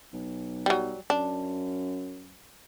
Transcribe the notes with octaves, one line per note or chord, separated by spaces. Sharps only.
B1
F#3 G3
F#2 D4